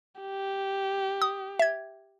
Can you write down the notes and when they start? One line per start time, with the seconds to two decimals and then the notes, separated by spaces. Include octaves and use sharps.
0.21 G4
1.22 D#6
1.59 E5 G#6